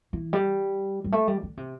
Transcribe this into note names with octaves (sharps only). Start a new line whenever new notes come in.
E3
G3
G3
A3
G3
D3
C3